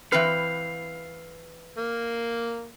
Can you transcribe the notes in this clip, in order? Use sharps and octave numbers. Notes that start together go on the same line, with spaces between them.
E3 C4 B4 F5
A#3